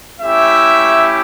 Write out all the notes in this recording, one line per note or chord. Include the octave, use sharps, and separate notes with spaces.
A3 C#4 E4 G4 E5